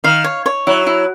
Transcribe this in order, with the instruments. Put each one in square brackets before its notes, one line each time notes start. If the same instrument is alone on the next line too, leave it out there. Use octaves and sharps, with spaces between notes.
[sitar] D#3 [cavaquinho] F5
[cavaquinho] C#5
C#5
[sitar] F#3 [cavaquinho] E4
[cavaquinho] E4